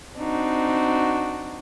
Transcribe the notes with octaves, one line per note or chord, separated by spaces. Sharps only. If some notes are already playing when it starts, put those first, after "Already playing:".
C4 D4 D#4 F#4